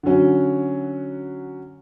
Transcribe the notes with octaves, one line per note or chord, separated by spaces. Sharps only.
D3 F#3 C#4